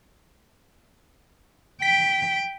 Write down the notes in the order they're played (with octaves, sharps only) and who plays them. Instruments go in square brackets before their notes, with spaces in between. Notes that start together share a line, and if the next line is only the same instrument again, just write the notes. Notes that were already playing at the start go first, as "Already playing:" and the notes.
[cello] G5 [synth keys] B6